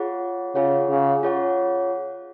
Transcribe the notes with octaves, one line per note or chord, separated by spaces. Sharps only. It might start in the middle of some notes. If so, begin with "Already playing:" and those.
Already playing: F4 G#4 C#5 F#5
C#3 F4 G#4 C#5 F#5
C#3
F4 G#4 C#5 F#5